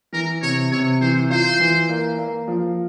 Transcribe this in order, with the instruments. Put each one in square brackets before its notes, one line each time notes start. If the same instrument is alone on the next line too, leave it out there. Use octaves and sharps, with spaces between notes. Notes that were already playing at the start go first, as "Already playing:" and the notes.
[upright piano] E3 [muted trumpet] A#4
[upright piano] C3 [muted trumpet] C#5
[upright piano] C3 [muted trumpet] C#5
[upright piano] E3 [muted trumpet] C5
[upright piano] F4 [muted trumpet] C5
[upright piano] E3
A#3
A#3
F3